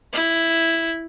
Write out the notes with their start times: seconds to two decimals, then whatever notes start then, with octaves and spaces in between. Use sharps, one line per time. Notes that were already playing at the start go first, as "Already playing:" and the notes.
0.13 E4